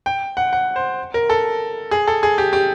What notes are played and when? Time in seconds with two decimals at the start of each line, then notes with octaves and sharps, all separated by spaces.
0.06 G5
0.37 F#5
0.53 F#5
0.76 C5
1.14 A#4
1.30 A4
1.91 G#4
2.08 A4
2.23 G#4
2.38 G4
2.53 G4